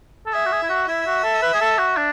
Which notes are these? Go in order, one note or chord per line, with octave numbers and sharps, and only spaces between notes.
A4
G#4 E5
F#4
G#4
E4
F#4
E4 E5
F#4
A4
B4
G#4
A4
F#4
D4